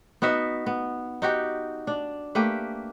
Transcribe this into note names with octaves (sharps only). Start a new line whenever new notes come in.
B3 D#4 F#4 E5
B3
D#4 F#4 G4
D4
A3 A#3 G4 B4